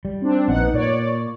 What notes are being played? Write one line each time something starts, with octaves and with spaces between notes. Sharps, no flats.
G3
C4 D4
A#1 B3 D#4 F#5
A#2 C#5 D5